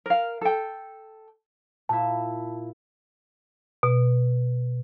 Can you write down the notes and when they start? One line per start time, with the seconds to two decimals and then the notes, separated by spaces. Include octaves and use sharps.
0.06 A#4 F5
0.41 A4 G5
1.89 A#2 E4 A5
3.83 B2